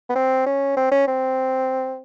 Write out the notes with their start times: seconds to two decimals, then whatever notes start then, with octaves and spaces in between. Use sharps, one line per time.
0.09 B3
0.15 C4
0.46 C#4
0.77 C4
0.91 C#4
1.07 C4